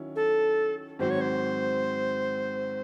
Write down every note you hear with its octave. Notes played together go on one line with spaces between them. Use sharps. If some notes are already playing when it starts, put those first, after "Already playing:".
Already playing: D#3 F#3 C#4 E4
A4
G#2 D#3 F#3 C4 F#4 C5
C#5
C5